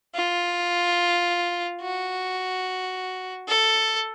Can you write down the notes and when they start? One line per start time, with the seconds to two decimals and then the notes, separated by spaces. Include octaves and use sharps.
0.15 F4
1.81 F#4
3.48 A4